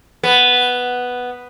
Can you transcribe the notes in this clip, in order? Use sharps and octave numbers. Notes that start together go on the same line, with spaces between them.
B3